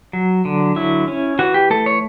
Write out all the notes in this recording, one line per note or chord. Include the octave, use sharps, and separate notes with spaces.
F#3
D3
F#3 E4
C#4
E3 F#4
G4
A3 A4
C#5